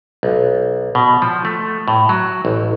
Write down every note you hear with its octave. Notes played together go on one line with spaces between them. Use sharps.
B1
B2
F3
A3
A2
F#3
A1